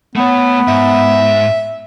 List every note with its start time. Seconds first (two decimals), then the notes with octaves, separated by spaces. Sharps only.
0.16 A3 B3 C#5
0.68 G#2 E5